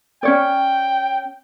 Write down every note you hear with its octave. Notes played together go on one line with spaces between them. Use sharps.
C#4 C#5 D5 G5